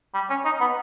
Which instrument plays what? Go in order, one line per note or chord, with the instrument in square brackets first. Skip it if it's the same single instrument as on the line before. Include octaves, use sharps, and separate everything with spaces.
[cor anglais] G3
C#4
D#4
B3